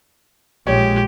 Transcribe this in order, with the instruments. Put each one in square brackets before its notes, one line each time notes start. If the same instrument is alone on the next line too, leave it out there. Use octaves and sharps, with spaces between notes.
[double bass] A#1 G#3 [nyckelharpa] G4 [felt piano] C#5